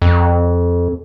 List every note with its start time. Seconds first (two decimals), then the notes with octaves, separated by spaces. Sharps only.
0.02 F2